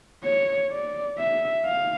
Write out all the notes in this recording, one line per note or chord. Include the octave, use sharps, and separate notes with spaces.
C#5
D5
E5
F5